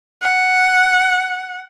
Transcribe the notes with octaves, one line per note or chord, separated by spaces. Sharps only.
F#5